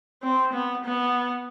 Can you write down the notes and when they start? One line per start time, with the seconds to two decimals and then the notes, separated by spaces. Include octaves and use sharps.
0.23 C4
0.53 B3
0.85 B3